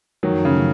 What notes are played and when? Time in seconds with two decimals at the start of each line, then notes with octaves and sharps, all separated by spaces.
0.23 F#2 D#3 F3 F#3 A3
0.45 C#3